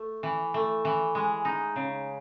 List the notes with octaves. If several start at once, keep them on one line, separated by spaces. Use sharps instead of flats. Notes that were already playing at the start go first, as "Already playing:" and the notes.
Already playing: A3
E3
A3
E3
G#3
D#4
C#3